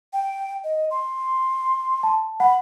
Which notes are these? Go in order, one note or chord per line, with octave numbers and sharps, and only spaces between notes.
G5
D#5
C6
A5
F#5 B5